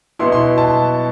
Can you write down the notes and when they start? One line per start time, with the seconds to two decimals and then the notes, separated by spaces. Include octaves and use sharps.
0.19 B2 B3 E4 C6
0.32 C6
0.58 A5